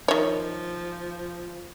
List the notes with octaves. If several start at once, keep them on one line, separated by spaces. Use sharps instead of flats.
D#3 F3 C#5